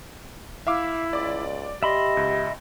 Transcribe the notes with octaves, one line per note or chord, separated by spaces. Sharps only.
E4 E5 F5 D6
C#2 D5 D6
G4 D#5 E5 B5 C6
C#2